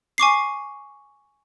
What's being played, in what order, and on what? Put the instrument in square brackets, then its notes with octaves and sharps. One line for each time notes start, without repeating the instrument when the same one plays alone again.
[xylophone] G#5 C#6 D6 C7